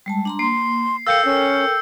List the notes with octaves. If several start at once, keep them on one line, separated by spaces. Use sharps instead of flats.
G3 G#3 A5
D4 A#5 C6
A#3 C6 C7
A4 A#4 F5 G5 E6 G6 C#7
C#4